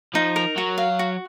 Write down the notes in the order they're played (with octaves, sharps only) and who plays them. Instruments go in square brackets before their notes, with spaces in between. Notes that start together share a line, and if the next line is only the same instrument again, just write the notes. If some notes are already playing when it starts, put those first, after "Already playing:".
[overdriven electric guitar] F3 [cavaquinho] D#4
[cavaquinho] A#4
[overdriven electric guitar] F#3 [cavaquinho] F#4
[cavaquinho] F5
F#4